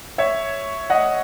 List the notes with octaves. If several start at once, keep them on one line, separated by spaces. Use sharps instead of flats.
C#5 E5
D#5 F#5